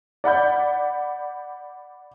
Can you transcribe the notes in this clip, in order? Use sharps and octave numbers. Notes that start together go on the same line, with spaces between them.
D5 F#5 B5 G6